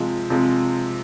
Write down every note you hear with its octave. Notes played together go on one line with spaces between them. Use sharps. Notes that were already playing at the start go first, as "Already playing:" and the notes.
Already playing: C3 F3 G#3
C3 F3 G#3